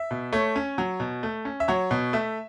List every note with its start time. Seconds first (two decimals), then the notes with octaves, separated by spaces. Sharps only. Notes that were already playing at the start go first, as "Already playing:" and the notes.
Already playing: E5
0.11 B2
0.33 A3 C#5
0.56 C#4
0.78 F#3
1.00 B2
1.23 A3
1.45 C#4
1.60 E5
1.68 F#3 C#5
1.91 B2
2.13 A3 E5